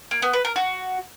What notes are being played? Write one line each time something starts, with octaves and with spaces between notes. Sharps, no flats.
A#3
B3
B4
A#4
F#4